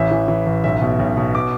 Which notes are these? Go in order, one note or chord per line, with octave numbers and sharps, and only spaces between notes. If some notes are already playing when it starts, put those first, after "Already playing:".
Already playing: A1 E3 E5
E3
E3
A1
B1 E5
B2
B1
B2
D6